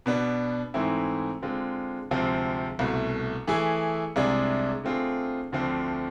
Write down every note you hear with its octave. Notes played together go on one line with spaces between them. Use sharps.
B2 B3 D4
G#2 E3 A3 C4 E4
D3 G#3 C4 F4
D2 C3 F3 G#3 C4
C2 B2 A3
E3 A3 E4 G#4
C2 C3 G#3 D4 G#4
D3 A3 C4 F4 G#4
D2 D3 F3 A3 C4